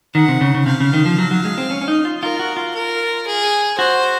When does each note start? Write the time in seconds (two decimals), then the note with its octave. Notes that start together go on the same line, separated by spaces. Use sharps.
0.14 D#3 F#5
0.28 C3
0.41 C#3
0.54 C#3
0.66 C3 F5
0.80 C#3
0.93 D#3
1.05 F3
1.18 F#3
1.31 F#3
1.45 G#3
1.58 C4
1.71 C#4
1.81 C#4
1.88 D#4
2.05 F4
2.22 F4 A#4
2.39 F#4
2.57 F4
2.75 A#4
3.27 G#4
3.78 F#4 C5